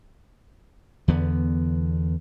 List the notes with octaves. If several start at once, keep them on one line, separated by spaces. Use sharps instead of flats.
E2 D3 B3